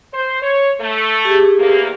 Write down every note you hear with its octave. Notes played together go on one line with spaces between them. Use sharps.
C5
C#5
A3
G4 G#4
E2 A#3